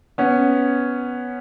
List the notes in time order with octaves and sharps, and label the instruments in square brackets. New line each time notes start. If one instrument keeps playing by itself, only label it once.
[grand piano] B3 C#4